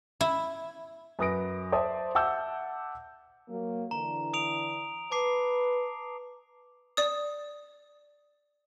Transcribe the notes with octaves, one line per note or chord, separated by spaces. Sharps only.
E4
F#2 B4 D#6 A#6 D7
C5 D5 E5 A5 D#6
E5 F#5 A5 D6 E6 G6
F#3 A#3
D3 E3 A#5
D#6 D7 F7
B4 A5 D6 C7
D5 D#6